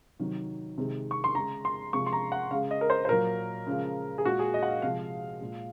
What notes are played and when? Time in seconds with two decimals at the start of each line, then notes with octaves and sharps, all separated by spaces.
0.20 C3 D#3 F#3
0.78 C3 D#3 G#3
1.11 C#6
1.24 C6
1.35 C#3 G#3 A#5
1.65 C6
1.93 C3 F3 G#3 C#6
2.06 C6
2.13 A#5
2.32 F#5
2.51 C#3 G#3 F5
2.71 D#5
2.81 A#4
2.90 C5
3.05 C5
3.09 A#2 F#3 A#4
3.67 C#3 F3 G#3
4.18 G#4
4.25 A#2 G#3 F#4
4.39 G#4
4.54 D#5
4.63 F#5
4.68 F5
4.82 C3 F3 G#3 F5
5.41 A#2 G#3